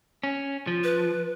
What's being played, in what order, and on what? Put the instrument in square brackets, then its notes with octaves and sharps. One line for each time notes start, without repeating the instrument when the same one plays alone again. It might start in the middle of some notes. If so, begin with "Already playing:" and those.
[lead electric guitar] C#4
F3
[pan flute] B4